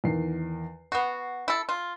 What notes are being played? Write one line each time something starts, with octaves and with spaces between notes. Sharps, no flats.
E2 D#3 C7
B3 F#4 C7
E4 A4
F4